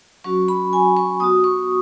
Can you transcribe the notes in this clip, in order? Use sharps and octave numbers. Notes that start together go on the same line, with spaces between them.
F#3 C#4 F#4 C#6
B5
G#5
C#6
B3 F#4 D#6
C#6